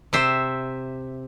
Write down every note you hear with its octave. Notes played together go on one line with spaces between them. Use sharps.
C3 C5 E5